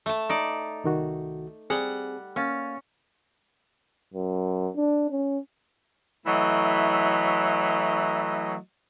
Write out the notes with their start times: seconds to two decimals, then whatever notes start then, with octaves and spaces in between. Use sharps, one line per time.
0.06 A3 A5
0.29 D#4 D5
0.84 C2 D#3 F#4
1.70 G3 C4 G#4 F#5
2.36 A#3 C#4 F5 A6
4.14 F#2
4.76 D4
5.11 C#4
6.27 E3 F#3 A3 E4 D#5